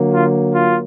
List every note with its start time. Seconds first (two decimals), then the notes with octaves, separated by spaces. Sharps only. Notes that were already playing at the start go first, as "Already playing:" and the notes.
Already playing: D3 F#3 A#3
0.13 F4
0.53 F4